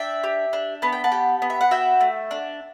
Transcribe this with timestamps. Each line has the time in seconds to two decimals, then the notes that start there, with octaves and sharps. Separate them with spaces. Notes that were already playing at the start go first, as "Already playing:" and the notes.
Already playing: D4 E5 G5
0.24 G4
0.53 D4
0.82 B3 A5
0.93 G5
1.04 F#5 A5
1.12 G4
1.42 B3
1.50 E5
1.61 F#5
1.71 F#4 E5 G5
2.01 A3
2.31 D4